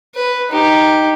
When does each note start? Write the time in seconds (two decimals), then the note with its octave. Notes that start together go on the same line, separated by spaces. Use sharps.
0.15 B4
0.51 D#4 G4